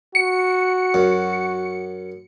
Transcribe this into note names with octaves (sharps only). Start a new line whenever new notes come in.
F#4 C#7
F#2